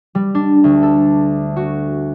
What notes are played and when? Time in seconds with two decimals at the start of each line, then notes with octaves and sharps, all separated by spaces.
0.15 G3
0.35 D4
0.64 D2
0.83 A4
1.56 F#4